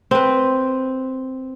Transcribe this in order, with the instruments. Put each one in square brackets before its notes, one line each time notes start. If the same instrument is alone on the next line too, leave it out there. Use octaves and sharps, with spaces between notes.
[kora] C4 B4